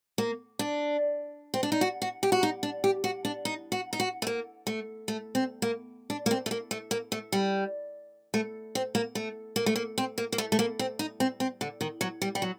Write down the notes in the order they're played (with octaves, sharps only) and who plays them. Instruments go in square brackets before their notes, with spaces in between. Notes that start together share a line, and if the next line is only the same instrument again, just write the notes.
[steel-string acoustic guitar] A#3
D4
C4
D4
D#4
F#4
F#4
G4
F#4
D#4
D4
G4
F#4
D4
D#4
F#4
D#4
F#4
A3
A#3
A3
A3
C4
A#3
D4
A#3
C4
A3
A#3
A3
A#3
A3
G3
A3
C4
A#3
A3
A#3
A3
A#3
C4
A#3
A#3
A3
A3
A#3
C4
D#4
C4
C4
D3
D#3
F#3
G3
G3
F#3